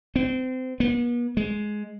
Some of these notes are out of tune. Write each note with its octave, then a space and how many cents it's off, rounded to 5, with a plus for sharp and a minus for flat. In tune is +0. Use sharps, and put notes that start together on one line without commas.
C4 -25
B3 -45
G#3 +10